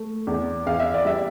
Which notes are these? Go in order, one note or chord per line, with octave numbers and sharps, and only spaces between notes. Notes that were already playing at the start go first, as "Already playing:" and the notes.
Already playing: A3
E2
E2 F5
E5
D5
G3 E5